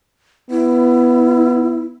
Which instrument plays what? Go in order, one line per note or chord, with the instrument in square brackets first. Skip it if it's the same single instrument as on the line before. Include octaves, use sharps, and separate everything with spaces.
[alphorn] B3 [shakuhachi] E4